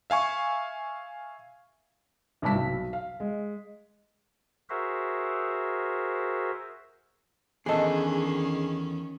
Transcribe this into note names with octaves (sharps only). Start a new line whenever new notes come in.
E5 F5 G#5 C#6
G#1 G2 C3 A5 B6
B1
F5
G#3
F#4 G#4 A#4 C5 E5
E2 D#3 C#4 D4 G#4 A4 D#5